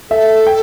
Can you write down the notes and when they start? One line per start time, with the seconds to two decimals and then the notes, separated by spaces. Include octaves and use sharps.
0.10 A4 E5
0.47 G5